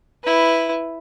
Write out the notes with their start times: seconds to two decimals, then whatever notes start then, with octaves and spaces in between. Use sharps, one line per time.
0.24 E4 B4